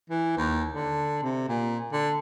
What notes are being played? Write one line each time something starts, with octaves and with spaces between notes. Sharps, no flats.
E3
D#2
D3
C3
A#2
D3